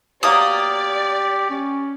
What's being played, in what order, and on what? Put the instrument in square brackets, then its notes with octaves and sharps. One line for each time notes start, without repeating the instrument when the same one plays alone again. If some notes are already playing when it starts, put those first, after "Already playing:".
[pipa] B2 F#3 A#3 [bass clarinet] G4 [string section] D5 [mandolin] D#6
[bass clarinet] C#4